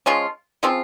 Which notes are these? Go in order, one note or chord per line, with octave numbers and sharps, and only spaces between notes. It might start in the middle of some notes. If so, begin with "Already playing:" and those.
F3 G#3 C#4 F4
C#3 F3 C4 F4